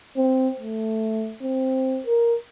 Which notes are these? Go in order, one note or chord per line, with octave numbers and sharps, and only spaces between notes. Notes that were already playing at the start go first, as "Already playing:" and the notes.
C4
A3
C4
A#4